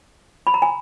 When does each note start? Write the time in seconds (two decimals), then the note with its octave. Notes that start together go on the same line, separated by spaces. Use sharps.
0.47 B5
0.54 A#5
0.62 G#5